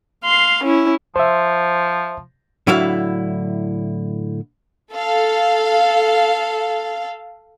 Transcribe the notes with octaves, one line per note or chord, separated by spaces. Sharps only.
F5 C6
C#4 E4
F3 C5 E5
A2 D3 F#3 E4 E5 F5
A4 F5